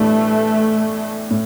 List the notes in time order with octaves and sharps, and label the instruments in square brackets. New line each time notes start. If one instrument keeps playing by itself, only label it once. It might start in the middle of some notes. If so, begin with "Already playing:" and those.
Already playing: [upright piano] A2 E3 G3 B3 D4 [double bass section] A3
[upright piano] A2